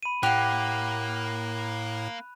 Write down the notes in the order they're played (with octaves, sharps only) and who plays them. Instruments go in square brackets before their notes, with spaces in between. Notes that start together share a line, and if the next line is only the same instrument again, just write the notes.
[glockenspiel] B5 D#7
[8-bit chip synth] A2 [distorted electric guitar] A#3 [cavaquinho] G4 F#5 [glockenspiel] F#6 F7